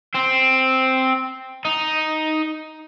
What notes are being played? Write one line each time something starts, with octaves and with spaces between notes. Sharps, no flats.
C4
D#4